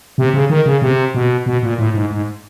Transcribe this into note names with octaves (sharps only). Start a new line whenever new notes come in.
C3
C#3
D#3
C#3
C3
B2
B2
A#2
A2
G#2
G#2